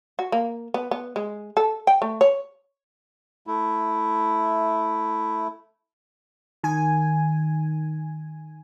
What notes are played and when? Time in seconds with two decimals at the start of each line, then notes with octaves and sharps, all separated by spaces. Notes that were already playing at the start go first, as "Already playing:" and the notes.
0.19 F#4
0.32 A#3
0.74 B3
0.91 B3
1.16 G#3
1.57 A4
1.87 G5
2.02 A3
2.21 C#5
3.47 A3 E4
6.64 D#3 G#5